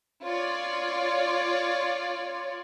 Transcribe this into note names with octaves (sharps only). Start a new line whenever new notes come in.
F4 C#5 D5